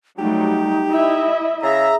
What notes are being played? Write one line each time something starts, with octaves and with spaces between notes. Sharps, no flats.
F#3 G3 A3 D#4 G4
E4 D#5 E5
C#3 G#4 E5 A#5